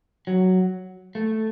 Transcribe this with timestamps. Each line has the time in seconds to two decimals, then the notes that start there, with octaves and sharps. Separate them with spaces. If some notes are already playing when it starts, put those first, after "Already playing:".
0.27 F#3
1.15 A3